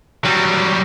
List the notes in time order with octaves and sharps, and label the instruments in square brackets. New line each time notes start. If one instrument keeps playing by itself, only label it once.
[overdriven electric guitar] F#3 G3